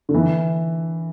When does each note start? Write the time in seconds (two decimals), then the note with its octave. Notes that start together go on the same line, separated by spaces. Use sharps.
0.09 D3
0.14 E3